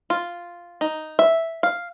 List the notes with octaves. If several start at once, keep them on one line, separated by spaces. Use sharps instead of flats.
F4
D#4
E5
F5